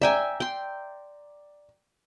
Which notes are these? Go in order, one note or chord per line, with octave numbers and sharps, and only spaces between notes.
D5 E5 G5 G#5 A#5
G5 C6